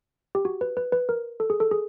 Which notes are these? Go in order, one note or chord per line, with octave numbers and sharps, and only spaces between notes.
G4
F#4
B4
B4
B4
A#4
A4
G#4
A4
G#4